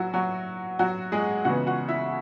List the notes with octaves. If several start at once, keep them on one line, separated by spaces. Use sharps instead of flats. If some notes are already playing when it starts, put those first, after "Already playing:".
Already playing: F#3 E4 F#4
F#3 F#4
F#3 F#4
G#3 G#4
C#3 E3 G#3 B3 F#4 F#5
F#4 F#5
E4 E5